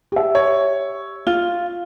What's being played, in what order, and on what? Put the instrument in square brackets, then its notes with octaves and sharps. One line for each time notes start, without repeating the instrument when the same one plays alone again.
[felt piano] G4 E5
[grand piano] C#5
[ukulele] F4 [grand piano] G7